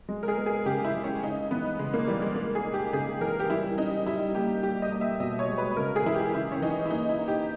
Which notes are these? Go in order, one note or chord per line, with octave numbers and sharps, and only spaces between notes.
G#3
A#4
G#4
B3
G#4
C#3 G4
E4
G#3
C#4
C#3 D#4
E3 B3
C#3 G#3
A#3
E3 G3
G#3
G#3 A#3
G#4
D#4
G4
C#3 G#4
E3 A#4
G4
G3 E4
C#4 D#4
G3 E4
A#3 G4
G3 G4
D#5
A#3
E5
B2 D#5
C#5
G#3
B4
C#3 A#4
G#4
E3 E4
G4
C#3 E4
C#4
E3 D#4
E4
A#3 D#4
E4
D#4
G4